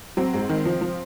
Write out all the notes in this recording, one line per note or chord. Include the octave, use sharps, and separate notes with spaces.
F#3 C4
G#2
D#3
F3
F3